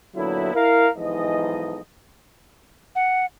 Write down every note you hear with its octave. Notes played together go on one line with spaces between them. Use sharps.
A#2 D3 F#3 B3 E4
E4 A#4 F5
B1 G#2 E3 F3 D#5
F#5